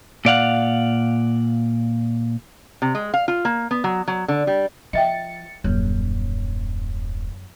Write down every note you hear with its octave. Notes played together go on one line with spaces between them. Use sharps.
A#2 D5 F5 F#5
C3
G#3
F5
F4
A#3
B3
F#3
F#3
D3
G3
F3 F4 D#5 E5 G5 A6 C#7
D#1 F#2